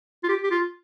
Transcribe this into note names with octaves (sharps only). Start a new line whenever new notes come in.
F4
G4
G4
F4